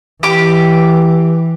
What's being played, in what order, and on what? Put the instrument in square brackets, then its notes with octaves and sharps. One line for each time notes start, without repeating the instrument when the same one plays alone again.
[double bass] E3 [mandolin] G4 D6